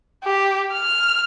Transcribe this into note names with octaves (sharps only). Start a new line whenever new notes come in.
G4
F6